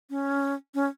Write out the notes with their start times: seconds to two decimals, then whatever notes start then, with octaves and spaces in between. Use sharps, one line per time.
0.10 C#4
0.75 C#4